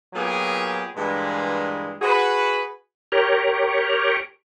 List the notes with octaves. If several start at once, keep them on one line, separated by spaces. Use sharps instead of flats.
A#2 F#3 B3 F4 G4 G#4
G2 A#2 E3 G#3
F#4 G#4 B4
G4 A#4 C#5